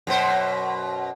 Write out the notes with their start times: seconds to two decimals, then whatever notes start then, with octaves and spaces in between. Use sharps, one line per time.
0.07 F#2 B2 C5